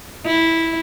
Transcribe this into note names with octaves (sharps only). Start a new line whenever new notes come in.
E4